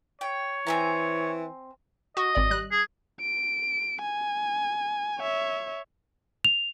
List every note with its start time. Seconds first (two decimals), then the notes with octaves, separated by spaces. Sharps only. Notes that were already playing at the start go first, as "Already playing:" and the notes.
0.21 C#5 G5
0.67 E3 C4 G#5 A#5
2.17 F#4 D#5
2.35 G#1 D5
2.50 G3 F#6
2.72 G#4
3.21 D7
4.01 G#5
5.19 C#5 E5
6.45 F7